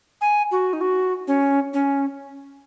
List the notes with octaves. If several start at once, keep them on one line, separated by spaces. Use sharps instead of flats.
G#5
F#4
D#4
F#4
C#4
C#4